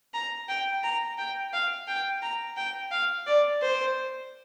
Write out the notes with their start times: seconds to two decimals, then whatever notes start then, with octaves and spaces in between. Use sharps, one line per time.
0.14 A#5
0.49 G5
0.83 A#5
1.18 G5
1.53 F5
1.87 G5
2.22 A#5
2.57 G5
2.92 F5
3.27 D5
3.62 C5